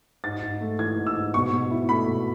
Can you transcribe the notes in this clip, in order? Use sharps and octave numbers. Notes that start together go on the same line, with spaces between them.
G#2 A6
G#2
A3
E3 G#6
G#2
E6
G#2
B2 C#6
B2
E4
A3 B5
B2